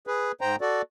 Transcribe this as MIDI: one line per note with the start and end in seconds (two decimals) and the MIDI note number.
0.07 0.32 68
0.07 0.32 71
0.41 0.56 44
0.41 0.56 72
0.41 0.56 79
0.41 0.56 82
0.61 0.82 66
0.61 0.82 69
0.61 0.82 74